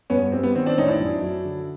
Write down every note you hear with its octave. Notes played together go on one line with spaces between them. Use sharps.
G2 B3 C#4
G3 C4
B3
D#3 C4
C4 D4
A1 C#4 D#4
D4 E4
F#2
F#3
D3